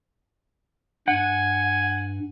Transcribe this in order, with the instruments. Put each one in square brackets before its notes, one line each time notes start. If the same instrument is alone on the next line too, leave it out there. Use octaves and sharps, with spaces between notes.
[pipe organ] G2 [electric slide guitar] F#5 [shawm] G#5